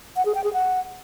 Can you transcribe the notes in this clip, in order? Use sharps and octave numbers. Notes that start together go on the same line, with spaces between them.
F#5
G#4
G5
G#4
F#5